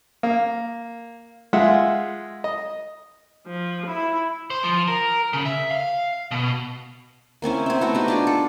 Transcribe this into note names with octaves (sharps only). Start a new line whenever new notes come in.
A#3
G#3 F4 E5 F#5
D#5
F3
E4
C5
F3
A#4
C#3
E5
F5
B2
A#3 C4 C#4 E4
C4 E5
A3 B3 E4 F#4
B3 D#4 F#4 G4
D4 F4 G#4
A4